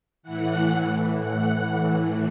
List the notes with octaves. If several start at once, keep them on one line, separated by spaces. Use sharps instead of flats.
A2 E3 F#5 F#6
A2 E3
A2 E3 F#5 F#6
A2 E3